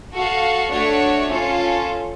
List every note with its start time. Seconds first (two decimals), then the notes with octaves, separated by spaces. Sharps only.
0.13 F#4 A4 F5
0.71 A3 D4 F#4 C#5
1.30 C#4 F4 A4